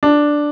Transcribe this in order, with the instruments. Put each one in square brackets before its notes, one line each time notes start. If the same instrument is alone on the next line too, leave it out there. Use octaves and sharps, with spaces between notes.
[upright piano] D4